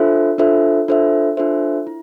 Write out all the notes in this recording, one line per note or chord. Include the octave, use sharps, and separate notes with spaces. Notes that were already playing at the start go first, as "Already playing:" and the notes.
Already playing: D4 F4 A4 C5 E5
D4 F4 A4 C5 E5
D4 F4 A4 C5 E5
D4 F4 A4 C5 E5
E4